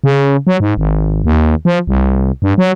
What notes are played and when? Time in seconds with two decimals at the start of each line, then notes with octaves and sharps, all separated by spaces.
0.04 C#3
0.47 F#3
0.60 G#2
0.77 G#1
1.24 D#2
1.65 F3
1.87 C2
2.42 G2
2.58 F#3